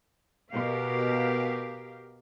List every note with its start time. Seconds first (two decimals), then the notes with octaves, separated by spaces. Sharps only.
0.52 B2 G4 A#4 F5